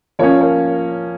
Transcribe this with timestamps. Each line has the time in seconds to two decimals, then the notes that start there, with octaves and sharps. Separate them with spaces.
0.19 F3 A#3 C#4 C#5 F5
0.40 A#4 C#5